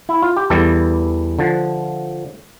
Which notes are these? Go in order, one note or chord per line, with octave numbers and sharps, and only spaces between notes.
E4
F4
G4
E2 E3 G3 A4
D3 F3